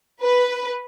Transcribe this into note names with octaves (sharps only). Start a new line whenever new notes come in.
B4